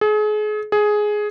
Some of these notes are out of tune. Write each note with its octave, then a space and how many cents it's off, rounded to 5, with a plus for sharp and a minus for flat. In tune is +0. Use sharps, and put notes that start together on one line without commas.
G#4 +35
G#4 +10